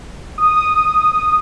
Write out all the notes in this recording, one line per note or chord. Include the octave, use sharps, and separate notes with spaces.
D#6